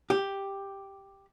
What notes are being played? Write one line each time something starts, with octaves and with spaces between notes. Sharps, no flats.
G4